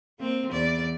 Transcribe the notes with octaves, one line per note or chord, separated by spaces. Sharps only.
A#3 C4
E2 D5